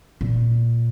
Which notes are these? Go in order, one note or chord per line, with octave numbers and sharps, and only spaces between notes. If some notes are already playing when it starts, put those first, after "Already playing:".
A#2